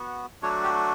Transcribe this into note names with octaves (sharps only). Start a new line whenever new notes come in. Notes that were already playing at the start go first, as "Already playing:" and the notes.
Already playing: B3 F#4
F#3 A3 D4 F#4 C#5
G4